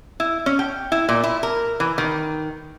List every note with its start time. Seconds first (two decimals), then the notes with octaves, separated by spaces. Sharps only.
0.20 E4
0.46 C#4
0.59 G5
0.92 E4
1.09 A#2
1.24 E4
1.43 A#4
1.80 E3
1.98 D#3